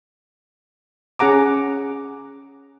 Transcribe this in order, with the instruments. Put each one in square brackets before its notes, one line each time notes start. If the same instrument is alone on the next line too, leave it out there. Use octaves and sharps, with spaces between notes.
[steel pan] C#4 G#4 F#5 A#5 D6